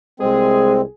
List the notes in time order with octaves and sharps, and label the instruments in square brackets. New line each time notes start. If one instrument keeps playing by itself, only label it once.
[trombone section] C2 G#3 [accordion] C4 [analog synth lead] G#4